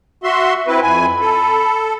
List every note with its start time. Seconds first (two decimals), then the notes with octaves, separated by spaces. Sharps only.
0.24 F#4 E5 C6
0.67 C4 E4 B4
0.82 F2 G#5 B5
1.21 A4